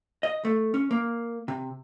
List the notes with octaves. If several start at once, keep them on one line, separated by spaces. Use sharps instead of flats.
D#5
A3
C#4
A#3
C3